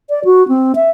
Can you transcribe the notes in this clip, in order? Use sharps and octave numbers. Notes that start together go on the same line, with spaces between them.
D5
F#4
C4
E5